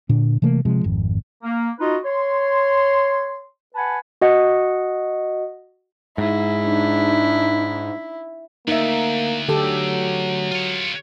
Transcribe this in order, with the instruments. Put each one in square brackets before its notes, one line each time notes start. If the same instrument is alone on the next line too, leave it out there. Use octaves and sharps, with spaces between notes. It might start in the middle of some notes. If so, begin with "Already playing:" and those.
[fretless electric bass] A#2 D3 D4
C3 E3 A3 A#3
C3 F3 G#3
G#1 F2
[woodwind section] A#3
D#4 F4 F#4 B4 D#5
C#5 C6
B4 F#5 G#5 A5 B5
[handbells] F#4 D#5 F#5
[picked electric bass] G#2 [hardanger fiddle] E4
[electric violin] D4 D#4
[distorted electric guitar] D2 [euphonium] A#3 [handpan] D#4 E5
[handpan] D3 G4 A4 [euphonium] F#3
[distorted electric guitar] F4 C#5